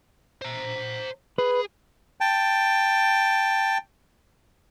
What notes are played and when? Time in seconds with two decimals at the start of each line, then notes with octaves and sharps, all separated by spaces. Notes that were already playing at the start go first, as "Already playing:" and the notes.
0.41 C5 A#5
1.38 G#4 B4
2.21 G5 A5